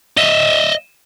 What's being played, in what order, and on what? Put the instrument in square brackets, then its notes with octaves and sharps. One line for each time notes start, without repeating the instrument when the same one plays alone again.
[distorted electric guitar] D#5 E5